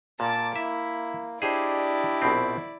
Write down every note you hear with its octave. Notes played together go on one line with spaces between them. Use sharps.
A#2 A#3 A5 D6
E4 E5
D4 E4 G4 G#4 C5 D5 D#5
A#1 B2 C4